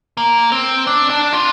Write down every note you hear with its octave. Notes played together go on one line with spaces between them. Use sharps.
A#3
C4
D4
D4
F4